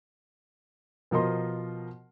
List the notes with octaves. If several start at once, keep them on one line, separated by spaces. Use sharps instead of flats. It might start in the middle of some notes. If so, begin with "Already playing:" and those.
B2 F3 A#4 D#5 C6